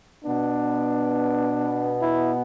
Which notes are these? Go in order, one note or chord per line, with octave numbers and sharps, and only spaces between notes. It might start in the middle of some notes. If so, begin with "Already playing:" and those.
B2 B3 D4
E4